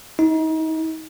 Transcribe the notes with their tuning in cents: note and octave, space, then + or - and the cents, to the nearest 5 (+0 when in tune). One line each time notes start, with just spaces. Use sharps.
D#4 +35